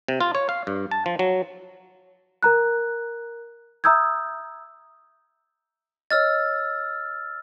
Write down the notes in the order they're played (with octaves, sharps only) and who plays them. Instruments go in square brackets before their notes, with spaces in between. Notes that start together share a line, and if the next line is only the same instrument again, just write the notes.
[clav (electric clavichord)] C3
F4
C#5
F5
G2
A5
F3
F#3
[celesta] A#4 A#5 F#6
E5 A#5 D#6 E6 G6 G#6
[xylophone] C#5 D#5 [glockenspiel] E6 F6 A6